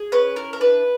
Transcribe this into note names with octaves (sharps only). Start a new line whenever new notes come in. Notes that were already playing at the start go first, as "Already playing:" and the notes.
Already playing: G#4
C#4 B4
E4 A#4
A#4
D4 B4